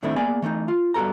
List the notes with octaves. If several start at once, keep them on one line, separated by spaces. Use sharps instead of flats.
A2 D#3 A3 C4 D4 E4
A#3 B3 G#4 D5 G#5
E3 A3 D4 D#4
F4
G2 B3 F#4 A4 A#5